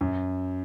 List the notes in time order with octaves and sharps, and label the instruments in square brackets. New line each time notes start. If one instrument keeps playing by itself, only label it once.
[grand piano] F#2